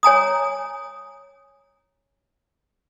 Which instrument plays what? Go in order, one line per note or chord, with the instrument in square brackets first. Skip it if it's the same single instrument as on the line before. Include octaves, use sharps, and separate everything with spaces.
[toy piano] C#5 G#5 A#5 D#6